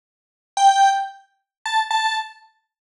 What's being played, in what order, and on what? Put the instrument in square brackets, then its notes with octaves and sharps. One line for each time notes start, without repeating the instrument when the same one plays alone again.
[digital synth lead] G5
A5
A5